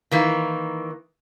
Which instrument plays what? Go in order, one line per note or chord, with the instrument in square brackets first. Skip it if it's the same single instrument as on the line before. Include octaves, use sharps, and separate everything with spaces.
[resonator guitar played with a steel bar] D#3 E3 A#3